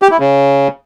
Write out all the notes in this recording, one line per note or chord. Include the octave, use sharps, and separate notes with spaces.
G4
E4
C#3